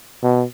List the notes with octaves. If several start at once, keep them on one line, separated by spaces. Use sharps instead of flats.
B2